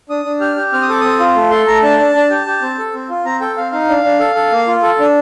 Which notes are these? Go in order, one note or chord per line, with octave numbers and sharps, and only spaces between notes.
D4 D#6
D4
G4 F6
G4
C4 F6
D#6
A4 D6
C4 D#6
F4
A3
A4 C6
A3 A#5
D4 A5
D4
D4
G4
G4
C4
A4
C4
F4
C4 A#5
A4 G5
C4 F5
D#4 F5
D4
D4
A4
A4
A#3
F4
A4
D4